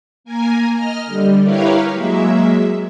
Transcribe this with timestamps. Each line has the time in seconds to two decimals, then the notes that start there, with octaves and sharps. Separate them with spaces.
0.24 A#3 A#4 G#5
0.73 D#5 F6
1.05 D3 G3
1.42 E4 G4 A#4 B4 C#5 F5
1.92 F#3 G#3 A#3 E5